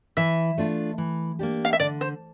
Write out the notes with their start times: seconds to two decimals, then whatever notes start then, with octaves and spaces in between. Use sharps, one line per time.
0.17 E3 E5
0.58 A3 D4 F4
0.98 E3
1.39 A#3 D4 G4
1.65 F5
1.73 E5
1.80 D3 D5
2.01 C5